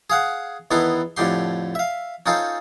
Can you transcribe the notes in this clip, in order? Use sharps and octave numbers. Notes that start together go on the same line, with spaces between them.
G#4 F5 F#5
E2 D#3 B3 E4 A4 C6
F2 A2 D3 G4 C6
E5 F5
C#4 D#4 F4 A4 C5